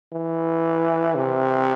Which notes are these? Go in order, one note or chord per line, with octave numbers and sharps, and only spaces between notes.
E3
C3